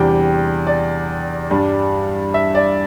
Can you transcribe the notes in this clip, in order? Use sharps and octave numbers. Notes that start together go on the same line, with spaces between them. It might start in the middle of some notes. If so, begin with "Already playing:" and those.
Already playing: E2 C3 G3 D4 G5
D5
G2 G3 D4
E5
D5